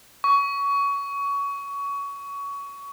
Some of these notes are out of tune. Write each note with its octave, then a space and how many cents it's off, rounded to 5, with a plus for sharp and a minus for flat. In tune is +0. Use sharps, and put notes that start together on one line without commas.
C#6 +25